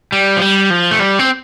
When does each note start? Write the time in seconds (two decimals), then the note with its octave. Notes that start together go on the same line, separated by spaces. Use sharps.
0.12 G3
0.37 F3
0.41 G3
0.70 F3
0.91 A3
1.00 G3
1.19 C4